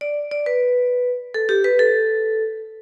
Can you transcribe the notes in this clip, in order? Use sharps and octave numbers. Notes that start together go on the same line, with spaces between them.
D5
D5
B4
A4
G4
B4
A4